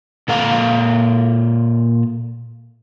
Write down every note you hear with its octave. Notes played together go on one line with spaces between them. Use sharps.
A#2 A4 F5 A#5